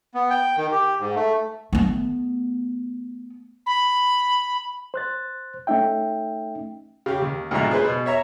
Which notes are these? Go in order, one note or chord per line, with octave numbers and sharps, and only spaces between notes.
B3
G5
D#3
G4
G#2
A3
A3 B3
B5
C5 F#6 A6
A3 C#4 D#4 E5 G5
C#3 G4
D#2
D2 G#2 B2 F3 E5 A#5
G#4 B4 C5
B2
C#5 E5 A#5